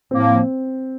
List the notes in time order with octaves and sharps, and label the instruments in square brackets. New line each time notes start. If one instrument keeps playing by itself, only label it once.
[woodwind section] A2 F3 A#3 [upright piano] C4